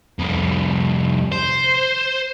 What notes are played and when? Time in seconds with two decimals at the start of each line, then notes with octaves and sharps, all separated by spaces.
0.19 C2 F2
1.32 C5